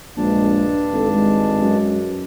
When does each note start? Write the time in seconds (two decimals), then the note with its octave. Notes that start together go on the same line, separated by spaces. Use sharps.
0.17 A#1 G2 G#3 D4 A5
0.93 G#1 A4
1.12 G#3
1.62 F#2